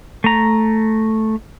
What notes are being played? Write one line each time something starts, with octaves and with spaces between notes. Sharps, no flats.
A3 A#5